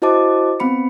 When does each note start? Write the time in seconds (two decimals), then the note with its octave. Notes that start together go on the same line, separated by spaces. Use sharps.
0.02 E4 F#4 C5 D#5 A5 D6
0.60 B3 C4 B5 C#7